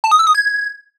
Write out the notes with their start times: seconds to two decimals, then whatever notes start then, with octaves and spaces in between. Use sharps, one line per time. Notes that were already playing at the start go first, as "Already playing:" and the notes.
0.04 A5
0.11 D#6
0.19 E6
0.27 D#6
0.34 G#6